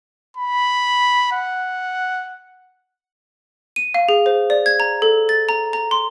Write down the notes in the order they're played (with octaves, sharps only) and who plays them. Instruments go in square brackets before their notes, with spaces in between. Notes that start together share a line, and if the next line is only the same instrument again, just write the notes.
[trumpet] B5
F#5
[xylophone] D#7
F5
G#4
C5
D5
G#6
A#5
A4
A6
A#5
A#5
C6